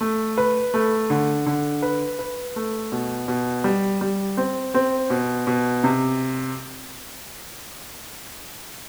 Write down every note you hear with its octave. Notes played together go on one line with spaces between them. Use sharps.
A3
B4
A3
D3
D3
B4
B4
A3
B2
B2
G3
G3
C4
C4
B2
B2
C3